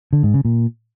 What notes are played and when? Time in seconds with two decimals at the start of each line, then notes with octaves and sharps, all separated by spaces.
0.13 D3
0.23 G#2
0.34 C#3
0.45 A#2